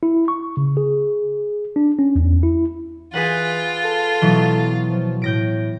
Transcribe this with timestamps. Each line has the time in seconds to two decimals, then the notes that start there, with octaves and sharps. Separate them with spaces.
0.03 E4
0.28 C#6
0.57 C#3
0.77 G#4
1.76 D4
1.99 C#4
2.15 E2
2.43 E4
3.14 E3 F4 G#4 B4 F#5
3.85 A4
4.22 B2 E3 F#3
4.89 F3
5.22 A2 G6 A#6 D7